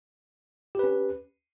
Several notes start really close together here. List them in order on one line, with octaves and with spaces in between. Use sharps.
G4 B4 C#4